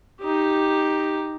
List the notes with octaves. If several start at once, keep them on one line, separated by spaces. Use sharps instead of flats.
D#4 G4